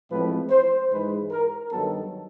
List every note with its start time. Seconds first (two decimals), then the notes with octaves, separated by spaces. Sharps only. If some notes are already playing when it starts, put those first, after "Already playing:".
0.10 A1 A2 F3 G#3 C4 B4
0.50 C5
0.91 G#2 E3 G#3 B4
1.31 A#4
1.71 G2 D#3 F#3 B3 A4